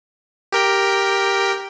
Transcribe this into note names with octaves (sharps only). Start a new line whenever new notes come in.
G4 A#4 G5